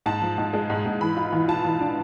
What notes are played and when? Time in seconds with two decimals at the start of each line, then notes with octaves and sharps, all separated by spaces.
0.06 G#2 A5
0.22 F3
0.38 G#2
0.53 G#3
0.70 G#2
0.86 G#2
1.01 E3 B5
1.17 F4
1.33 E3
1.48 F4 A5
1.65 E3
1.81 D4